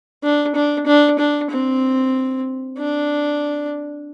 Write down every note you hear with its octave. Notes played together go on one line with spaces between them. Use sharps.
D4
D4
D4
D4
C4
D4